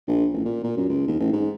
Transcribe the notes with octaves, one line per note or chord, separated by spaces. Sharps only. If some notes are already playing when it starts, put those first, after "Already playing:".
A#1
A1
A#2
A#2
F#2
C#2
D#2
A1
G#2